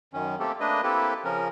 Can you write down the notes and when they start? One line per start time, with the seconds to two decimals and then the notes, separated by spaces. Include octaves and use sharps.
0.13 F#2 D#3 C#4
0.40 A3 A#3 C4 G4 A4
0.60 A3 A#3 D4 B4 D#5
0.83 A#3 C4 E4 G4 A4 B4
1.25 C#3 F3 C#4 A#4